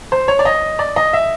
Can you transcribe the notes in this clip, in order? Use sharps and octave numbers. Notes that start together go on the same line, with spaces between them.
C5
C#5
D5
D#5
D5
D#5
E5